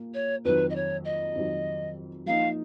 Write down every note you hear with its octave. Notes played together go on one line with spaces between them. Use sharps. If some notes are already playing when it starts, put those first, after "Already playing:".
Already playing: A#2 A#3
C#5
F2 D#3 F#3 B4
D#5
C#5
D#5
F2 D#3 F#3
F3 A#3 D#4 F5